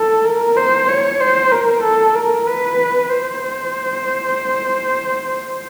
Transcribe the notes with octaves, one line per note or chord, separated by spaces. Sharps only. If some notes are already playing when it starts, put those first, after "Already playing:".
Already playing: A4
A#4
C5
C#5
C5
A#4
A4
A#4
B4
C5